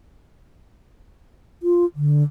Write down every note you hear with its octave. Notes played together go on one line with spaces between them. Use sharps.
F4
D3